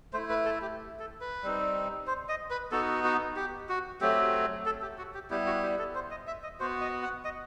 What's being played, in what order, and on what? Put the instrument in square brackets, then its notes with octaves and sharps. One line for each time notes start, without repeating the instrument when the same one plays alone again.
[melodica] A3 E4 C5
B4
A4
G4
A4
B4
G3 C4 D#4
C5
D#5
B4
B3 D#4 F#4 A4
F#4
G4
F#4
F#3 A3 C4 G4
A4
G4
F#4
G4
G3 B3 E4 G4
F#4
G4
A4
C5
D#5
E5
D#5
B3 F#4 C5
D#5
F#5
D#5